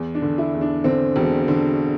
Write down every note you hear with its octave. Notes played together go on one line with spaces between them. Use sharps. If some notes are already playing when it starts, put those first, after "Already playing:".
Already playing: E2
D4
D3
E4
E2
D4
D3 C4
E1
D3